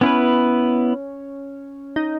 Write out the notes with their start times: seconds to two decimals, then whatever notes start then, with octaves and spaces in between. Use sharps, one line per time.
0.01 B3 C#4 E4 B4
1.96 D#4